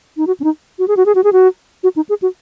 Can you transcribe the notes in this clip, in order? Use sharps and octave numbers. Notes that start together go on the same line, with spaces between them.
D#4
F#4
C#4
D#4
F#4
G#4
F#4
G#4
F#4
G#4
F#4
F#4
D#4
G#4
F#4